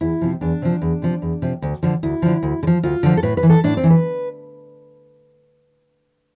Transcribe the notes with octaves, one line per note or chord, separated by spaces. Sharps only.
E2 E4
C3 F3
E2 D4
C3 F3
E2
C3 F3
E2
C3 F3
D2
D3 F3
D2 E4
D3 F3
D2
D3
F3
D2 F4
D3 F3
A4
A2 B4
B4
E3
A4
A2 D4
C4
E3
B4